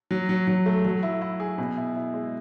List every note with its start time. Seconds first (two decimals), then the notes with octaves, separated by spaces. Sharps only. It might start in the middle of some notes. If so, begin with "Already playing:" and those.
0.11 F#3
0.29 F#3
0.47 F#3
0.66 A3
0.85 F#3
1.03 E4
1.22 E4
1.40 G#4
1.58 B2
1.77 E4
1.96 E4
2.14 G#3